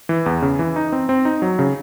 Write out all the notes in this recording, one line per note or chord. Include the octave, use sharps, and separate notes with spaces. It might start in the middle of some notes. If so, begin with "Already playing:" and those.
E3
E2
C#3
E3
D#4
C4
C4
D#4
F#3
C#3